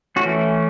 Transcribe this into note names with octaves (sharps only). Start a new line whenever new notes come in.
E3 A3 C#4 F#4